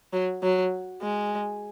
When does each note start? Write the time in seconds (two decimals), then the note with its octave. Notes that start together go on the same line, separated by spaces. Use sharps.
0.13 F#3
0.43 F#3
1.02 G#3